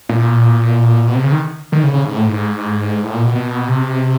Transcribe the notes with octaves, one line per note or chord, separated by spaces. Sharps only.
A#2
B2
C3
C#3
D#3
D#3
C#3
C#3
G#2
A2
G#2
A2
A#2
B2
B2
C3